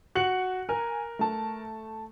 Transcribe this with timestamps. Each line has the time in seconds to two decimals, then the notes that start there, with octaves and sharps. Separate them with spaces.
0.15 F#4 F#6 C#7 F#7
0.69 A#4 G#5
1.19 A3 A5